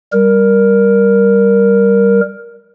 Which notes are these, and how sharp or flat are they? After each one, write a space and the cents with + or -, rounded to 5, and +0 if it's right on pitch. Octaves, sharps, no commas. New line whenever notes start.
G3 +0 A#4 +5